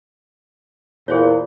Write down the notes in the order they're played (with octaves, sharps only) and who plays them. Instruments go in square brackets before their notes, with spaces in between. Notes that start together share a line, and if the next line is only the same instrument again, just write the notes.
[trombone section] E2 A#2 [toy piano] G#4 C5 C#5